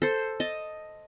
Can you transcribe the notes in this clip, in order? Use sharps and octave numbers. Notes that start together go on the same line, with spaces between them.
A4 C5
D#5 A5